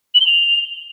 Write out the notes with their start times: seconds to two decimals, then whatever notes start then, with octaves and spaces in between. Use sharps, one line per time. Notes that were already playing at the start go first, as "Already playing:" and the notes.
0.14 F#7
0.20 G7
0.27 F7